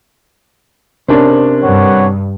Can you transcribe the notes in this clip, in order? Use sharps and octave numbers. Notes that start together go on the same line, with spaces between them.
C3 C#4 D4 A#4 C5
G2 B4 C#5 F#5